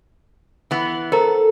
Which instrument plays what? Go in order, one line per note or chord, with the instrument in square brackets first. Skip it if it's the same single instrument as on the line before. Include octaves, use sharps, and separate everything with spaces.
[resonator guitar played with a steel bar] E3 B3
[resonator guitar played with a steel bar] A4 [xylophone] A#4 C5 A#5